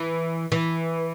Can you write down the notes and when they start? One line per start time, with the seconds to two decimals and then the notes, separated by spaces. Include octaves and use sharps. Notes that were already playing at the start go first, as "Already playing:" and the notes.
Already playing: E3
0.52 E3